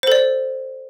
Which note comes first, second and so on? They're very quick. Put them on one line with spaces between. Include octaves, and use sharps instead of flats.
C5 A4 D5